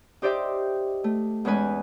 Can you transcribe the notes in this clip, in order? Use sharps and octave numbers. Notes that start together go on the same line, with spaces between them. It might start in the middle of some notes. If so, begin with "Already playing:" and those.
D#4 G4 C5 D5 E5 G5
A3
E2 G#3 C#4 B4 G#5